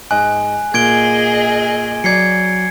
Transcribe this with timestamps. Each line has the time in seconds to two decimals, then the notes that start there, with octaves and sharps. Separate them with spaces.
0.11 G#2 D#5 G#5 F#6
0.74 A#2 G#4 D#5 G#6 D7 G7
2.04 F#3 D5 G#6 C7 C#7